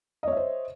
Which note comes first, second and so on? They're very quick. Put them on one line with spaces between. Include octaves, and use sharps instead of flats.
D#5 C#5 E5 C5